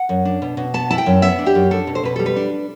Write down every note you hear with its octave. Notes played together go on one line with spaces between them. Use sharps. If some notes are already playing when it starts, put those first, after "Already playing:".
Already playing: F#5
F#2
D4
B2
B2
B3 A5
E4 A5
G5
F#2
B3 E5
D4
G4
F#2
D4 A4
B2
C5
B2 B4
G3 A4
B4
D4